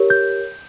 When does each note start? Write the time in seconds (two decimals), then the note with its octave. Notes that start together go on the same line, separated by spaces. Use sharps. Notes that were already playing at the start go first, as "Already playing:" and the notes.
Already playing: G4 A#4 C#5
0.10 G6